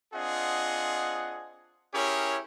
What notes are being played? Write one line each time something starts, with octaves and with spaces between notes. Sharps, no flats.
C4 D4 F4 G#4 D#5 F#5
C#4 E4 G4 G#4 A#4 C#5